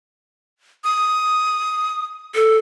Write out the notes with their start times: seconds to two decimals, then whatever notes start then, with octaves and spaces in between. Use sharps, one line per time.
0.84 D#6
2.35 A4